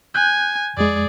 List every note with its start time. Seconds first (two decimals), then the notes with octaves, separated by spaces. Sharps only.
0.15 G#5 F#6 G6
0.77 F2 G#3 G#4 D5